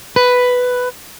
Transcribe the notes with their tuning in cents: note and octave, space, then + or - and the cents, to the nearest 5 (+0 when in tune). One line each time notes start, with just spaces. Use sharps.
B4 +5